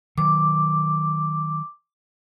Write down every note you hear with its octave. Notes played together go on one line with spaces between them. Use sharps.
D#3 F#3 D6